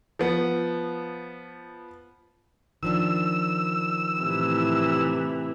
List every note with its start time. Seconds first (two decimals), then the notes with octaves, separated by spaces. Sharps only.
0.19 F3 B3
2.83 D#3 F3 D4 E6
4.21 A2 C3 E3